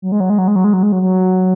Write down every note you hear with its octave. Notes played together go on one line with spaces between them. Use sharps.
F#3
G#3
F#3
G#3
F#3
G#3
F#3
G#3
F#3
G#3
F#3
F#3